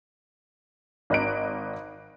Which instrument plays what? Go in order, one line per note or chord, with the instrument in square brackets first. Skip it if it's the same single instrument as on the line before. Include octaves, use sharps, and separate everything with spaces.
[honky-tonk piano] G#1 D#5 F#6 D7